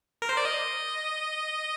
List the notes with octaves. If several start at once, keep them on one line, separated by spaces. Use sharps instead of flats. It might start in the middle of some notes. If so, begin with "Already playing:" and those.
A#4
C5
D5
D#5